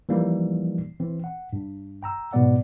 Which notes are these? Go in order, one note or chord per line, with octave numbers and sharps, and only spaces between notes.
E3 F3 G3 A#3 D#4
E3 C4
F#5
G2
G5 A#5 E6
G#2 B2 F#3 B3 D5 F#5